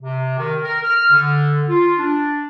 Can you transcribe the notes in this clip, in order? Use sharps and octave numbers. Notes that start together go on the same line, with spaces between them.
C3
D#3
A#4
F6
D3
F4
D4